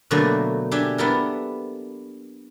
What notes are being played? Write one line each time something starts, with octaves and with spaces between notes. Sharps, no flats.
B2 D3 F#3 A3 A#3
D4 G4 E5 G#5
B3 D4 E4 G4 A4 A#4